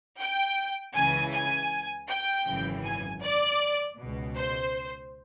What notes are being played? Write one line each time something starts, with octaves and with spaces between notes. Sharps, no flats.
G5
C#2 C#3 E3 G#5
G#5
G5
G#1 F#2 C#3 E3
G#5
D5
C#2 B2
C5